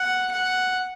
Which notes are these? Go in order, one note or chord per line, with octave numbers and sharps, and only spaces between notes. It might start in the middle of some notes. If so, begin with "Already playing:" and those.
Already playing: F#5
F#5